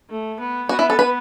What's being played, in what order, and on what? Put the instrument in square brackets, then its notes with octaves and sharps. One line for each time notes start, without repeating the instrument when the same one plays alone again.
[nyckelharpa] A3
B3
[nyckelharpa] B3 [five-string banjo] F#4
[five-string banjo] E4
A4
B4